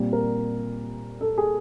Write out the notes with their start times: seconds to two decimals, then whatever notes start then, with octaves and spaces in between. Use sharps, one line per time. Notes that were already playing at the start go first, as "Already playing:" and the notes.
Already playing: A#2 G3 C4
0.13 A#4
1.21 A4
1.38 G#4